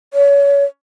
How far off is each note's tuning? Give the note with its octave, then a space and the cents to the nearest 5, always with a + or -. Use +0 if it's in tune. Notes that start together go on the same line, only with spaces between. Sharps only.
C#5 +30